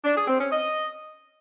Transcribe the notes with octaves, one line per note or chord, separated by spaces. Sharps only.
D4
G#4
C4
C#4
D#5